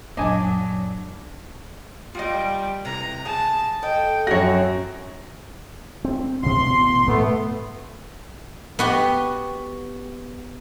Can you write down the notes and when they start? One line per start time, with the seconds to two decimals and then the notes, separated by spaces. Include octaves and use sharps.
0.17 A#1 F#2 F#3 D4 D#5 G#5 D6
2.15 G3 F4 D#5
2.85 C3 E3 A#5
3.25 G#4 A5
3.83 A4 D#5 G5
4.27 F#2 C4 F#4 C#5 A#6
6.05 C4
6.43 A1 B2 C6
7.07 G#2 A3 B3
8.79 B3 F#4 G4